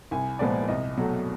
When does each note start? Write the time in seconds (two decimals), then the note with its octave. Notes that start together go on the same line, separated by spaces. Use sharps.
0.11 C2 G#5
0.39 A#2 F3 G#3 B3 D5
0.68 C2 D#5
0.97 B2 F#3 A3